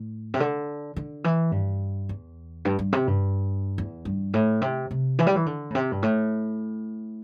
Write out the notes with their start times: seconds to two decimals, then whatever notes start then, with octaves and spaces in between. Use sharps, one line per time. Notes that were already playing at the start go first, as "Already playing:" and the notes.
Already playing: A2
0.34 C3
0.40 D3
0.96 D3
1.24 E3
1.52 G2
2.09 E2
2.65 G2
2.79 G2
2.92 C3
3.07 G2
3.78 E2
4.05 G2
4.34 A2
4.62 C3
4.91 C3
5.19 E3
5.27 G3
5.36 E3
5.46 D3
5.70 A2
5.75 C3
5.92 G2
6.03 A2